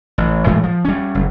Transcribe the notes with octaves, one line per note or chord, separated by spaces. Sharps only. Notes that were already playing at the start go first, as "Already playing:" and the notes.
A1
A2 E3 G#3 A3
F3
G3 C#4
F#1